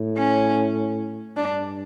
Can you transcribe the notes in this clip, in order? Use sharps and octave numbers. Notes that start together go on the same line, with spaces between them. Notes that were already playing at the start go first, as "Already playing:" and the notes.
Already playing: A2
C#4
G2 D4